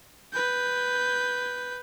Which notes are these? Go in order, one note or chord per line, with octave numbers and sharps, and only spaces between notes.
B4 G6